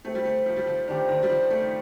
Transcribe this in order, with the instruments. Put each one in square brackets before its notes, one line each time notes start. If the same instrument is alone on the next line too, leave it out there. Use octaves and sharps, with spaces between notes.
[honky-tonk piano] A3 [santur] C4 G4 C5
[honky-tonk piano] G3
A3
F3
G3
F3
[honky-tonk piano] D#3 [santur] D4 G4 C5
[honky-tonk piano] D#3
G3
F3
A3